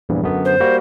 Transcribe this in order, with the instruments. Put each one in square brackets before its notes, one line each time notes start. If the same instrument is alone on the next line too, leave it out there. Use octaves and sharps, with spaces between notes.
[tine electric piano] A#1 E2 G2
F#2 D3 B3
[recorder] C5
[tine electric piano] G3 A#3 F#4